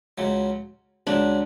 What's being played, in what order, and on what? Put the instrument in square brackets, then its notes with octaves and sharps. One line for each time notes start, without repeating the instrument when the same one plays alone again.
[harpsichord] C#2 C#3 F#3
[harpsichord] C#2 C#3 F#3 [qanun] D4